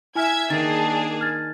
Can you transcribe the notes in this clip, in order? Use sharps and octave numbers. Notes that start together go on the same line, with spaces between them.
E4 E5 G#5 F6 G#6
D#3 A#3 D4 G#4 A6
F6 G#6 A6